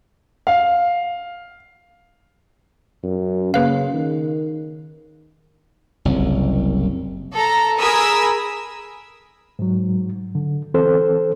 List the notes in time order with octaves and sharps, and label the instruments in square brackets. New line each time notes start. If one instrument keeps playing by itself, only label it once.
[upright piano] F5
[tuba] F#2
[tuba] C#3 [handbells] A#3 B4 F5
[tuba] D#3
[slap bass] F#1 C2
[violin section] A4 A#5
G#4 A#4 G#5 B5 D#6 E6
[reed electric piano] G#2 F#3
D3
E3 C4 A4 C5